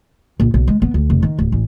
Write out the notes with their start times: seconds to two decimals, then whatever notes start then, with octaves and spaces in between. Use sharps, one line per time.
0.40 A#1
0.54 B1
0.67 G#3
0.82 B3
0.94 D2
1.10 F1
1.23 D#3
1.38 D1
1.52 A1